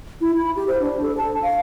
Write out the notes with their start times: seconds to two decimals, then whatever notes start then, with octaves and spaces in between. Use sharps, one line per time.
0.21 E4
0.37 B5
0.56 G4
0.68 C5
0.80 D4
1.02 A4
1.17 A5
1.42 F5